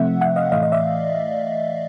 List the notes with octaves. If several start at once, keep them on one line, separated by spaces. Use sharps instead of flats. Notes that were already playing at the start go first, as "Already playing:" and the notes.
Already playing: C3 F3 A3 C4 E5 F#5
E5 F#5
D#5 F5
A2 E3 A3 D#5 F5
D#5
D5 E5